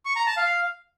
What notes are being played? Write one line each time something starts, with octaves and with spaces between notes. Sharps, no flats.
C#6
A#5
A5
F5